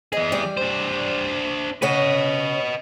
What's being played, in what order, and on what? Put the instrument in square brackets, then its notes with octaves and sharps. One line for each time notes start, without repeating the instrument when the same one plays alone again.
[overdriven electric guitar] E3 G#4 [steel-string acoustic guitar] D#5
[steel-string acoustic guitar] G3 D5
[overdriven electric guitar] D4 C5
[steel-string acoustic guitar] C#3 C#5 F#5 [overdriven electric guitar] B4 D#5